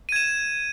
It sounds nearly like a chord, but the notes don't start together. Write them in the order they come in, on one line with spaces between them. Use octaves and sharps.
D#7 G#6 E7